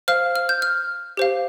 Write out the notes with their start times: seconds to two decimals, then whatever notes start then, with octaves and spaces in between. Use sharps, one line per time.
0.08 C5 F5 F6
0.36 F6
0.49 G6
0.62 F6
1.17 G4 C5 F5